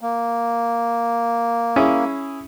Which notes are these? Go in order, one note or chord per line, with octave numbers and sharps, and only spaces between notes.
A#3
C#4 E4 G#4